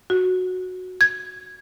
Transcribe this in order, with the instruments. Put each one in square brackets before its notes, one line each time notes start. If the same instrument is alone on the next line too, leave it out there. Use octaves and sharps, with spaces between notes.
[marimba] F#4
G#6